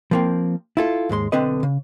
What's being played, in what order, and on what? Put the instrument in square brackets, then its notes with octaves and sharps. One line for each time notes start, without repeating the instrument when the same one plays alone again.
[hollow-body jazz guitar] F3 A#3 C4
E4 F4 A4
D#2 G#2 G#3 C6
B1 D3 C4 B4 D#5
C#3